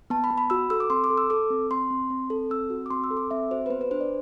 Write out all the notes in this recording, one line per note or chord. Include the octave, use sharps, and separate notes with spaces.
B3 A5
B5
B3
B5
F#4 E6
A4 E6
D6
C4 C6
D6
A4
E6
A4 D6
C4
C4 C6
C4
C4
A4
C4 E6
F#4
D6
C4 C6
E6
A4
D6
C4 E5
F#4 C5
B4
B3 C5
B4
D4 C5
D5